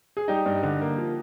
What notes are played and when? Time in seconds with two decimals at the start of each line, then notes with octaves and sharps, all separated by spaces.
0.17 G#4
0.28 G3 D#4 G4
0.46 G2
0.63 D3
0.81 A#3
0.98 F3